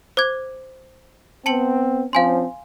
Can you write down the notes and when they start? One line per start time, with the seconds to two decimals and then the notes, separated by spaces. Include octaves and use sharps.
0.17 C5 D6 G#6
1.46 B3 C4 A5 C#7 F#7
2.13 F3 C4 C#4 F5 G#5 C6